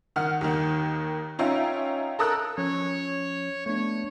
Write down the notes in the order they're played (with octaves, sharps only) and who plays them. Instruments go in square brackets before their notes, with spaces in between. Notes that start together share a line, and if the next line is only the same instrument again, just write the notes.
[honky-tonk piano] D#3 F#5 F6
D#2 D#3
C#4 D#4 F4 E5 G5 A#5
A4 A#4 D#6 E6 F#6
[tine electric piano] F3 C#4 [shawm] C#5
[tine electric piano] A3 B3 D4 [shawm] C#5